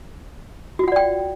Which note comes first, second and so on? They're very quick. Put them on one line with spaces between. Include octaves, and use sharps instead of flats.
F#4 F4 F#5 D5 G5